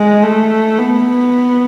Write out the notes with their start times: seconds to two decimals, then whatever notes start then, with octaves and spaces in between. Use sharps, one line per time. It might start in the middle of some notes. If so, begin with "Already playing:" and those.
Already playing: G#3
0.23 A3
0.78 B3